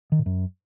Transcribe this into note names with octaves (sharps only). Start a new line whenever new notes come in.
D#3
A#2
F#2